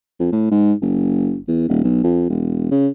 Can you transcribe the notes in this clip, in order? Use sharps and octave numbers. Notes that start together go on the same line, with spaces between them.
F2
A2
G#2
F#1
E2
D#1
B1
F2
E1
C#3